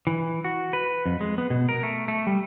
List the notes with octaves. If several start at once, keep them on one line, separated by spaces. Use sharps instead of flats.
E3
F#4
B4
F2
G#3
B3
B2
A#4
A3
A3
G3